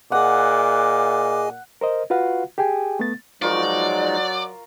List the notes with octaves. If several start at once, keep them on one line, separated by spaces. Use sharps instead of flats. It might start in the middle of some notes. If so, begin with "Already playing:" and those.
A#2 G#4 D#5 F#5 G#5 D6
A#4 C5 D#5
F4 F#4 B4 F5 F#5
G4 G#4 G5 G#5
A3 B3 A6
F3 F#3 G#3 D#4 F4 A#4 D5 C#6